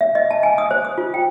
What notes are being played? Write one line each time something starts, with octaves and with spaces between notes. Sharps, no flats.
E5
D#5
A5
G#5
D#6
C5
D#6
F4
G5